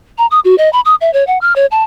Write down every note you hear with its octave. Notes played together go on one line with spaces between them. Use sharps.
A#5
D#6
F#4
D#5
B5
D#6
E5
C#5
F#5
F6
C#5
A5